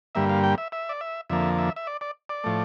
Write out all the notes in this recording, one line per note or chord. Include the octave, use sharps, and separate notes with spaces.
G2 D3 G3 A#3 E5
F5
G5
E5
E5
D5
E5
F2 D3 F3 A#3 E5
E5
E5
D5
D5
D5
A2 F3 A3